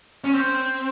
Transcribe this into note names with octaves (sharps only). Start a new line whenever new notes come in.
C#4
C4